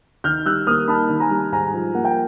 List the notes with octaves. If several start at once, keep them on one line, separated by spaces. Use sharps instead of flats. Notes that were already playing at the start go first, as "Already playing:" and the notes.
D#3 F6 G6
G3 E6 F#6
A#3 D#6 F6
D#4 A5 B5
D#3
G#5 A#5
G3
G#2 G#5 A#5
F3
A#3 F#5
G5